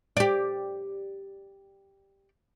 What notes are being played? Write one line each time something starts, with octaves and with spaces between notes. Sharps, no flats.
G4 D5